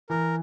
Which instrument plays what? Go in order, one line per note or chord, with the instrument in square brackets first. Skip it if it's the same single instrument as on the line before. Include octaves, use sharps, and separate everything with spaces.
[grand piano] E3 [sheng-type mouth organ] A#4